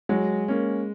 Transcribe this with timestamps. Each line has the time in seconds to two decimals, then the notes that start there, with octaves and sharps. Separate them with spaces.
0.09 F#3 G#3
0.48 A#3 C#4